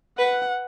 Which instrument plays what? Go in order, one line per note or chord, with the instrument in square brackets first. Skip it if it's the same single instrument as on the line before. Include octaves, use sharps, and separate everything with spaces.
[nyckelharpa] B4 [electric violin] F#5